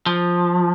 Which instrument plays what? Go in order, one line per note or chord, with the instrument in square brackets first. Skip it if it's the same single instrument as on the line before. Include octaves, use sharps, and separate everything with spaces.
[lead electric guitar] F3